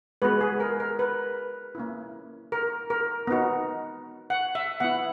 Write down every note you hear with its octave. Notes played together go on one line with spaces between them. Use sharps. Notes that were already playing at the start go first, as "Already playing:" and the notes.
G#3 B3 F#4 B4
G#4
A#4
A#4
B4
A#3 C#4 E4
A#4
A#4
B3 D#4 F#4
F#5
E5
B3 E4 F#5